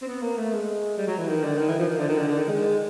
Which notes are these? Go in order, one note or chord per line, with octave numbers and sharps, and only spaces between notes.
C4
B3
A#3
A3
G#3
G3
F#3
E3
D#3
D3
D#3
E3
F3
D#3
D3
D#3
D3
D3
D#3
G#3